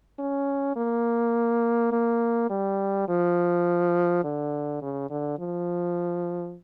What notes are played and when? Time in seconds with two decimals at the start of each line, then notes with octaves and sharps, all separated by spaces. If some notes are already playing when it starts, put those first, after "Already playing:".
0.19 C#4
0.76 A#3
1.92 A#3
2.50 G3
3.08 F3
4.24 D3
4.82 C#3
5.10 D3
5.39 F3